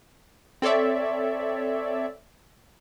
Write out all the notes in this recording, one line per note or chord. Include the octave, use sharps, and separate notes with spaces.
C4 A4 C#5 D5 E5